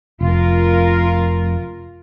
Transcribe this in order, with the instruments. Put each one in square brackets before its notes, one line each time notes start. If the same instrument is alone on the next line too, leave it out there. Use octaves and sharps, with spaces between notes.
[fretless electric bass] F1 [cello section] F4 A#4